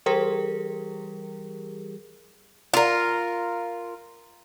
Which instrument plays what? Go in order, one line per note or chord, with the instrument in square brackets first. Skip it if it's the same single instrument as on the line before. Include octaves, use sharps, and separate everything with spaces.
[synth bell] E3 G3 G4 G#4 A#4
[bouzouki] F4 A#4